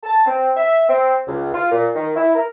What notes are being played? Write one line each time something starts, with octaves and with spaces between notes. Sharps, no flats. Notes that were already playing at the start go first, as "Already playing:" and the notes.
A5
C4
E5
C4
C#2
F4
A#2
D#3
E4
A#4